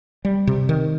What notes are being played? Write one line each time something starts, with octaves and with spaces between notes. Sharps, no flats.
G3
C3
D#3